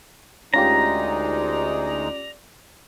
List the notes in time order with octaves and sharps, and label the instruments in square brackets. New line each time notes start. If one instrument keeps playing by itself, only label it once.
[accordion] D2 G#3 D#4 [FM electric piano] C#4 F4 G4 [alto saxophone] D5 [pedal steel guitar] A#5